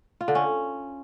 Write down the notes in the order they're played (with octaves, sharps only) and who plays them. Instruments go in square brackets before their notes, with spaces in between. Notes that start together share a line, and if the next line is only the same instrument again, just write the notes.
[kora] F4
D3
C#4